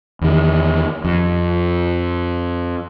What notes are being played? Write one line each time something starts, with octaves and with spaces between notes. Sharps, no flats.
E2 D#3
F2